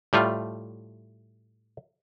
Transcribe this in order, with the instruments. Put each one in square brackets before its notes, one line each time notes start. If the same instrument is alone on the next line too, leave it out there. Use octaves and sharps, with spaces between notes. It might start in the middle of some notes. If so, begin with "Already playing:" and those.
[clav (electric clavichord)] A2 G3 A3 F4